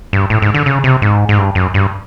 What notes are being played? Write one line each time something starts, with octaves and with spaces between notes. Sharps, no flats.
G2
A2
G#2
D3
C#3
C3
G#2
G#2
G2
F#2
G2